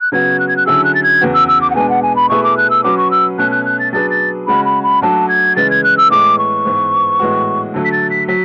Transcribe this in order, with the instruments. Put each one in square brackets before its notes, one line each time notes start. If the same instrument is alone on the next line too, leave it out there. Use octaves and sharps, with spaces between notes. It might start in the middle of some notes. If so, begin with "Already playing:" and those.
[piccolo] F#6
[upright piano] C#3 F#3 B3 F#4 [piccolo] G#6
[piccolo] F#6
G#6
F#6
[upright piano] D3 F#3 C#4 E4 G#4 [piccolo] E6
[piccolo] F#6
A6
G#6
[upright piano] E2 C#3 E3 B3 F#4
[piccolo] E6
E6
D6
F#5
[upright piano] B2 G#3 B3 D4 [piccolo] G#5
[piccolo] F#5
G#5
B5
[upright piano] B2 A3 E4 G#4 B4 [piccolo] C#6
[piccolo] D6
F#6
E6
[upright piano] F#3 C#4 F#4 B4 [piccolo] D6
[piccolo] C#6
E6
[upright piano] B2 A3 C#4 [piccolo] F#6
[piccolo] F#6
F#6
A6
[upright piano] F#3 B3 D4 G#4 B4 [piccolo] A6
[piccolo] A6
[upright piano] C#3 G#3 C#4 F#4 [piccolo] B5
[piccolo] B5
B5
[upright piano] F#3 A3 D4 F#4 [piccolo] A5
[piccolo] G#6
[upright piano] C#3 E3 G#3 [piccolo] A6
[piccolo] G#6
F#6
E6
[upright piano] A2 E3 G#3 B3 [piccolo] D6
[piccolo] C#6
[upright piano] G#2 E3 B3
A2 E3 G#3 B3 F#4
D3 F#3 A3
[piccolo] B6
A6
B6
[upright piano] F#3 [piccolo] B6